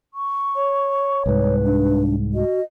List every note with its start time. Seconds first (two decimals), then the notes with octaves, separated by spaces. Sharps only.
0.14 C#6
0.55 C#5
1.26 C2 G#2 B4
1.64 D4
2.34 F#4 D#5